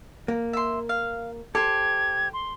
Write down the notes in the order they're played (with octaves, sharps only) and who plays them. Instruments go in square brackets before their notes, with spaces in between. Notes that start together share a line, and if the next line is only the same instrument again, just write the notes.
[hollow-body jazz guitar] A#3
[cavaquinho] E5 C6
F5
[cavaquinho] G4 C5 [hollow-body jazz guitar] A4 [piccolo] G#6
[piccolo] C6